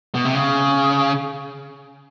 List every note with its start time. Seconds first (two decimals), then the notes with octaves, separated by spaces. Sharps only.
0.15 B2
0.25 C3
0.35 C#3